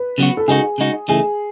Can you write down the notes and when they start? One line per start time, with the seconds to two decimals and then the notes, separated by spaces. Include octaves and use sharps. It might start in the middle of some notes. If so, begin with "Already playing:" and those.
Already playing: B4
0.18 C#3 F#3 B3 F#4
0.37 A4
0.48 C#3 G#3 D#4 F#4 G#4
0.78 C#3 G#3 D#4 F#4
1.08 C#3 E3 A3 D#4 G#4